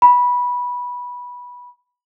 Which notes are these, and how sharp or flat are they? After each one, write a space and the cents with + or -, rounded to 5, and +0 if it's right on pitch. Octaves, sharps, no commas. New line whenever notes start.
B5 -15